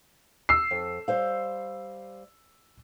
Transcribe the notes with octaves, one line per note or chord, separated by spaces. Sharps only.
E6 C7
F2
G3 C5 F5